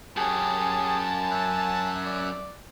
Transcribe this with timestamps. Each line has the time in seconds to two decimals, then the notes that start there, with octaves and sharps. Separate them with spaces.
0.17 F#2 C#4 G4 G#4 G#5 A5
1.31 E5 F#6
2.05 D5